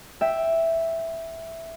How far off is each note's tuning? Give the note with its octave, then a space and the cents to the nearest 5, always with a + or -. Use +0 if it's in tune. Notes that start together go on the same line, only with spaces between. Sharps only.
E5 +0 G5 +0